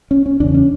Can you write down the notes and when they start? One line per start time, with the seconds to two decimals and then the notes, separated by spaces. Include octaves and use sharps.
0.11 C#4
0.26 C#4
0.40 E2 C#3 D4
0.54 C#4